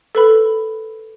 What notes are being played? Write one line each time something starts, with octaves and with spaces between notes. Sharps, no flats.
A4 B4 B5